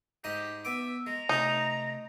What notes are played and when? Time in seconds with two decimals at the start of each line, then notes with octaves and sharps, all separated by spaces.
0.24 G#2 G4 D#5 A#5
0.65 B3 E5 D6
1.07 G#3 A#5
1.29 C3 A3 D#4